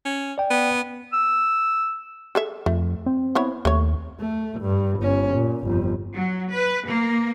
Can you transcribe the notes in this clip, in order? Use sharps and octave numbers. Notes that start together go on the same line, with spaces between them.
C#4
D5 G5
B3
E6
G#4 A4 E5
F2 A3
C4
B3 E4 C#5
D#2 A3 C#5
A3
G2
G1 C#4
A#2
G1 F2
F#3
B4
A#3